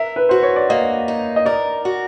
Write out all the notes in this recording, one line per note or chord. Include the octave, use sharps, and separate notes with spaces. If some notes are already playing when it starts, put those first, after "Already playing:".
Already playing: A#4 E5
B4
F#4 C5
C#5
D5
A#3 D#5
D#4
D#5
A#4 D5
F#4